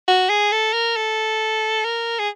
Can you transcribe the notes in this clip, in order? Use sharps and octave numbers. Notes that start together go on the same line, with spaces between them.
F#4
G#4
A4
A#4
A4
A#4
G#4